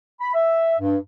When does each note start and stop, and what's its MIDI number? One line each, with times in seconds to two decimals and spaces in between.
0.21 0.30 83
0.34 0.74 76
0.80 0.97 43